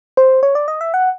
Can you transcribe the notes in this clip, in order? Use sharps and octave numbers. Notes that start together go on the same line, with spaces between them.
C5
C#5
D5
D#5
E5
F#5